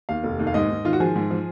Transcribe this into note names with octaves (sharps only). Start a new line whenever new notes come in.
D#2 F5
F1
D#2
F5
G#2 D#5
G#2
D#3 F4
F#4
F3 G#4
G#2
F3